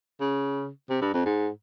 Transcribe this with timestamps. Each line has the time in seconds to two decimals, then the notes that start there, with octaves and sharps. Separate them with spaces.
0.21 C#3
0.90 C3
1.02 G2
1.14 F2
1.26 G#2